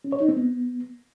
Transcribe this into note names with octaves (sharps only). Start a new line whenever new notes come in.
C#4
C#5
D#4
C4
B3